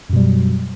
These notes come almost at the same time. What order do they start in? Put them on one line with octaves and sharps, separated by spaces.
F#2 B2 G3 F#3